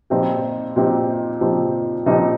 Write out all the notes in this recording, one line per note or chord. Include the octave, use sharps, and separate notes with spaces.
A#2 F3 C4 D#4 G4
A#2 F3 C4 D#4 G4
A#2 F3 C4 D#4 G4
A#2 F3 C4 D#4 G4